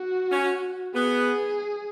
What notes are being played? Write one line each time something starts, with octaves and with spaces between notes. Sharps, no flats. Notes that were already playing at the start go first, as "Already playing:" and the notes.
Already playing: F#4
C#4
B3 G#4